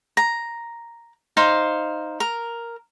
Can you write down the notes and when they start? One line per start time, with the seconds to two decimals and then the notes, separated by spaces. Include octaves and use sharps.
0.17 A#5
1.37 D#4 C5 F5
2.20 A#4